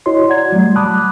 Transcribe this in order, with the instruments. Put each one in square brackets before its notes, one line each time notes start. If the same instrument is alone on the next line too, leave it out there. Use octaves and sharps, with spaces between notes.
[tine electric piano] E4 F#4 C#5 D#5 C6
D5 F#5 A#5 G#6
F#3 G3 A3
A5 B5 D6 D#6 F#6